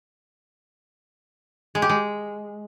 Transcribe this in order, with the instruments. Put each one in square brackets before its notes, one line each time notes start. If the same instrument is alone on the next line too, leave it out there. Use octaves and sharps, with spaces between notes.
[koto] G#3
G4
G#3